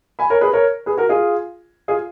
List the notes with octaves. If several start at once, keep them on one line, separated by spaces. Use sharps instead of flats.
G#5 B5
A#4 C#5
G#4 B4
A#4 C#5
G#4 B4
F#4 A#4
F4 G#4
F4 G#4